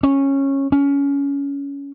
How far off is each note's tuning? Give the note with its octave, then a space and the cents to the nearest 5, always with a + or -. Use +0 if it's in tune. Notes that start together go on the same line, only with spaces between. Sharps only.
C#4 -15
C#4 +20